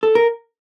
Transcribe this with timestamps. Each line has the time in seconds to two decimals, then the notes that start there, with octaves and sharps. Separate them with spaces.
0.03 A4
0.15 A#4